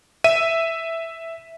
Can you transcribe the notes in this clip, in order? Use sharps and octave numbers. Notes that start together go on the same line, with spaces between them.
E5 D#7